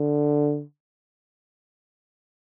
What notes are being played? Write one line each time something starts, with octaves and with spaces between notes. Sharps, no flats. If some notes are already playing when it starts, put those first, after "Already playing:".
Already playing: D3